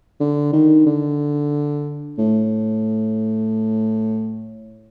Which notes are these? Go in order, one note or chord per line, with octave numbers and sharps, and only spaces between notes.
D3
D#3
D3
A2